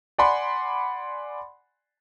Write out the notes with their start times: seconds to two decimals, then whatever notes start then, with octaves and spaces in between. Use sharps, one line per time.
0.18 D5 F#5 G#5 B5 C6